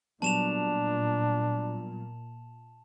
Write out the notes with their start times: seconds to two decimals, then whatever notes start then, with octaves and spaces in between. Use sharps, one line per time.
0.22 A#2 F#3 G3 B3 D4 A5 E7 F7